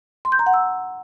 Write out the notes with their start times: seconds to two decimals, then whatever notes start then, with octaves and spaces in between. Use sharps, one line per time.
0.25 C6
0.32 G6
0.39 A#5
0.46 F#5
0.54 E6